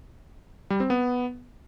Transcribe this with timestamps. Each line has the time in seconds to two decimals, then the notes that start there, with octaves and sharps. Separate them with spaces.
0.70 G3
0.80 C4
0.90 B3